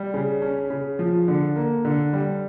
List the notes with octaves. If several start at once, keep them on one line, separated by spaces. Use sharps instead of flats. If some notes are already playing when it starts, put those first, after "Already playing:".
Already playing: G3
C#3
C#4
C#3
F3
D3
A#3
D3
G3